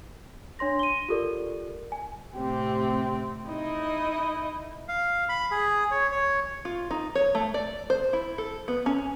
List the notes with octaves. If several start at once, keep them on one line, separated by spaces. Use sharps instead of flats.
D4 C#5 C6 A#6
D#7 G7
F4 G4 A4 A#4 D5
G#5
A2 C3 C4 G4
D#4 E4 D#5
F5
B5
G#4
C#5
C#5
F4
D#4
C#5
A3
D5
C5
E4
A4
B3
C#4